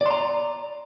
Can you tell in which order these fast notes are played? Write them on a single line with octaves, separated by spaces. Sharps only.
D5 C6 A#5